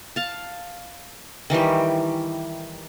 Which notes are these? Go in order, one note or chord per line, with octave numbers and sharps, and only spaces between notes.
F5 A5
D#3 E3 G3 G4